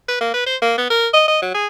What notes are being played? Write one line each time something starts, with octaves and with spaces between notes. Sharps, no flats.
B4
A#3
B4
C5
A#3
B3
A#4
D#5
D#5
F#3
G#4